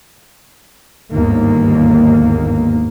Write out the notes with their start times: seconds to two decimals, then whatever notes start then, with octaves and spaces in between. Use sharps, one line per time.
1.11 G1 D#2 G#2 A#3